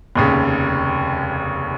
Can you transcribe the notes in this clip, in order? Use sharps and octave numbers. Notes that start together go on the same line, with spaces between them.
F1 D#2 C#3